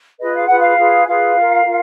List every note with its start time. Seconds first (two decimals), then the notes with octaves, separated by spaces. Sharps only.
0.18 F4 G#4 B4 D#5
0.34 F5
0.46 F4 G#4 B4 F#5
0.58 F5
0.77 F4 G#4 B4
1.06 F4 G#4 B4 F5
1.35 F4 A#4
1.64 F4 A#4